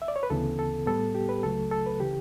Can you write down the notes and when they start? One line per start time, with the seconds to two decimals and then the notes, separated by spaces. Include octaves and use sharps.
0.02 E5
0.08 D5
0.16 C#5
0.23 B4
0.30 D2 C#3 E3 B3 A4
0.59 A4
0.87 A2 G3 B3 A4
1.15 G4
1.29 B4
1.43 C#2 C#3 F#3 A3 A4
1.72 A4
1.86 B4
2.00 C#3 E3 G4